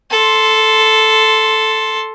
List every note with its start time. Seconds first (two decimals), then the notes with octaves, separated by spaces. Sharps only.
0.12 A4 C6